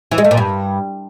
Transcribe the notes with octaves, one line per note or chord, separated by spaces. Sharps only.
E3
G#3
A3
A#2
G2